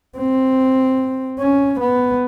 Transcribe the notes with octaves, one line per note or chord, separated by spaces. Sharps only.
C4
C#4
B3